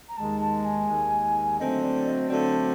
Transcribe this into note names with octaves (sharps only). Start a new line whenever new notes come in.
A#5
D#2 D#3 G#3 A5
A5
G#5
D#2 D#3 G#3
D3 F#3 A3 C4 D#5
D5
D#5
D3 F#3 A3 C4 D5